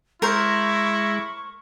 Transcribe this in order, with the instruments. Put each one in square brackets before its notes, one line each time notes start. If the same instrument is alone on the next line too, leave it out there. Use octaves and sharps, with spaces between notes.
[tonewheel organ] G#3 A#6 [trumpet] E4 [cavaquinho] A#4 C5 [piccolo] C#6